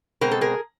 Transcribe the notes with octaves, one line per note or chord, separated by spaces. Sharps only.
B2 G#3 C4 A#4
A4
G#4 A#4